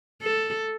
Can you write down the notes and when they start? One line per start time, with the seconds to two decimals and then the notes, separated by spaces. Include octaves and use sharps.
0.22 A4